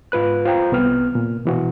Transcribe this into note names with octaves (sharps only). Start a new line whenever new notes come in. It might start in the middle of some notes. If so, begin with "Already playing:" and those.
G#2 F4 B4 F#6
F4 C5 G5 A#5
C2 B3 F6
A#2
B2 E3 F#4